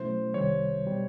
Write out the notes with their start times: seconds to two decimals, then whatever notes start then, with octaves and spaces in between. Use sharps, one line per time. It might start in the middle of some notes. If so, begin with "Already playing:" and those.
Already playing: B2 F#3 A3 C#4 E4 C5
0.34 C2 C3 D#3 G3 C#5
0.86 B2 G3